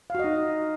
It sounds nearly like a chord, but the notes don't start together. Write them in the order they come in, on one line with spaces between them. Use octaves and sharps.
F5 F#4 D#5 D#4